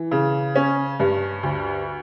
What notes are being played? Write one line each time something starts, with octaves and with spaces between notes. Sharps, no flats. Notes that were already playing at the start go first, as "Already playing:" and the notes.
Already playing: E3
C#3
C#4
G2
D2